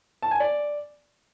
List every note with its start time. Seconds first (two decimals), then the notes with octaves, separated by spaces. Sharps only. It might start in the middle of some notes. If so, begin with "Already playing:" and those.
0.22 A5
0.31 G#5
0.40 D5